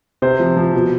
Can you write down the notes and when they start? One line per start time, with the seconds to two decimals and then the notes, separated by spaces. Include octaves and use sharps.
0.22 C3 C5
0.40 F3
0.57 F3
0.73 B2